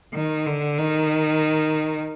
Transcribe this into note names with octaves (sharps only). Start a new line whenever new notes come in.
D#3
D3
D#3